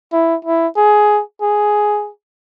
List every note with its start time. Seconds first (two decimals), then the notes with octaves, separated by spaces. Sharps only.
0.13 E4
0.45 E4
0.76 G#4
1.42 G#4